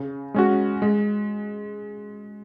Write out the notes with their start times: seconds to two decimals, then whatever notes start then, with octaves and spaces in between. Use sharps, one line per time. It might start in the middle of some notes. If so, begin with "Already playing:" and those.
Already playing: C#3
0.34 G#3 C#4 F#4
0.82 G#3